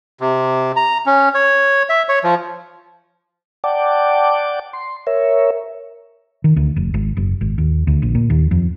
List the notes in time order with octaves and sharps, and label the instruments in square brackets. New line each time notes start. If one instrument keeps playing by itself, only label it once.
[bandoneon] C3
A#5
C#4
C#5
E5
C#5
F3
[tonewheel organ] D5 F#5 G5 A5 D6
C6
A#4 C#5 E5
[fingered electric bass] D#3
D2
F1
G#1
F#1
G#1
D#2
D2
A#1
A#2
D#2
F2